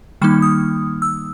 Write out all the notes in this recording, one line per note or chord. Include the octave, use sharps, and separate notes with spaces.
D#3 G3 A#3 D#4 F6
D#6
E6